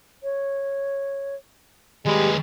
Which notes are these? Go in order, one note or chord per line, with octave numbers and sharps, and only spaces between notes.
C#5
D#2 G3 G#3 G4 B4